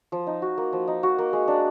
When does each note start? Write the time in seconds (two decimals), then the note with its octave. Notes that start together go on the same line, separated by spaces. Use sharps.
0.12 F3
0.27 D#4
0.42 F#4
0.58 A#3
0.73 F3
0.88 D#4
1.03 F#4
1.18 A#3
1.33 G#3
1.48 D4